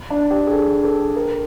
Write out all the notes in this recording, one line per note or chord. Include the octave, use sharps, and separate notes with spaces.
D4
G4
G#4
A4
A4
A#4